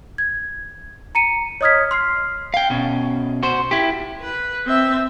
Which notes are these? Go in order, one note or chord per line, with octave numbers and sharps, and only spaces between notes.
G#6
A#5 C#7 D#7
C#5 D#5 D#6 F6 G#6 B6
C6 F6 C7
F5 G5
B2 C#4
F#4 C5
E4 G4
B4
C4 E5